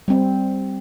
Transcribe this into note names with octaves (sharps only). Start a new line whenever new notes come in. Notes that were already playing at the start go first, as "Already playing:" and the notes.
G3 C4